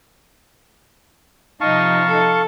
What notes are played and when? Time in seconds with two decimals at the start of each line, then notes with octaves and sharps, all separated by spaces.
1.61 C3 F3 D#4 F5 A5 C#6
2.06 A4